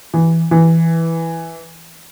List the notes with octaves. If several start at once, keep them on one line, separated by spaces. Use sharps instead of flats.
E3
E3